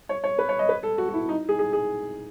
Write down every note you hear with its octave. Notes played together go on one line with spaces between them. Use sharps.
C#5
C#5
B4
C#5
D#5
B4
A4
F#4
F#4
E4
D#4
G#4
G#4
G#4